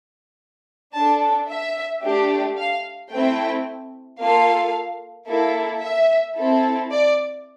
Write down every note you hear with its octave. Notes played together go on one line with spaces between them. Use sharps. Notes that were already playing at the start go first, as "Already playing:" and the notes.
D4 A4 A5
E5
A3 D4 G4
F5
A3 C4 E4 G5
A#3 F4 A4 F5
A#3 E4 A4
E5
C4 E4 A4
D5